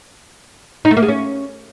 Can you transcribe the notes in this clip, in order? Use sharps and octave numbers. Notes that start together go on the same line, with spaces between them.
D#4
A3
A#3
G#3
C#4